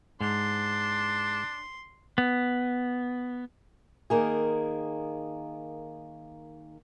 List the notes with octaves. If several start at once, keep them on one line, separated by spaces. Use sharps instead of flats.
G#2 D4 C6
B3
D#3 A#3 G#4